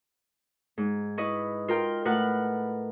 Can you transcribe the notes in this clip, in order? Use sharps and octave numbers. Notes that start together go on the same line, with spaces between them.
G#2
E4 B4 D#5 C#6
F4 A#4 G5
A2 A#4 B4 F#5 F#6